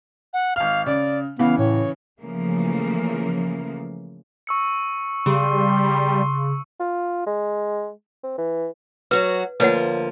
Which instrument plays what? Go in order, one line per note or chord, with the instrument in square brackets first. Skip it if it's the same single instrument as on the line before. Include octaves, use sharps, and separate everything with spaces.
[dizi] F#5
[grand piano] G#1 F6 [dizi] F5
[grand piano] C#3 [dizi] D5
[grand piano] C#3 E3 [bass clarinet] B3 [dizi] F5
[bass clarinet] A2 [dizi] C#5
[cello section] C#3 E3 F3 A3 A#3
[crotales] C#6 E6 C#7
[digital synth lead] C#3 [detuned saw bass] G3 [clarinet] C6
[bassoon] F4
G#3
C4
E3
[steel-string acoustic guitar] F#3 F#4 [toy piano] B4
[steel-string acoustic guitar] D2 F3 A#3 [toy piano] B4 C#5 F#5